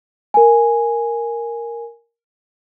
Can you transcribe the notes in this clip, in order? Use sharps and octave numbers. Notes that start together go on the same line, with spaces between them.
A#4 G#5